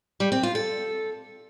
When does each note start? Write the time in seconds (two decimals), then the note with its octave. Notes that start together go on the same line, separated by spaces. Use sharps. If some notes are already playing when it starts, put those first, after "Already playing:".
0.20 G3
0.32 C4
0.43 F4
0.55 A4